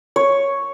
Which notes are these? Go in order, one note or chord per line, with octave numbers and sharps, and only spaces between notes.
C#5